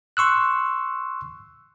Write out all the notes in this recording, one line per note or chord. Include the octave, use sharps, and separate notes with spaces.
C6 C#6 E6 F#6